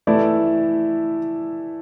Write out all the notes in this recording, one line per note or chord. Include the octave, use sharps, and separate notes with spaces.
E3 A3 E4 D5